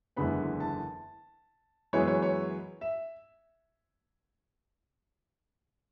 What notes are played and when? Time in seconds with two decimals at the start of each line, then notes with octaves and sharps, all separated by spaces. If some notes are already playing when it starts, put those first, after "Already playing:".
0.16 F#1 E2 D3 G#3 B3 B5
0.60 A5
1.93 F#2 E3 G#3 B3 E4 C#5
2.07 C#5
2.22 C#5
2.81 E5